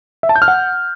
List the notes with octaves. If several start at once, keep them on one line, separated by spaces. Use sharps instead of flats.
E5
A5
G6
F6
F#5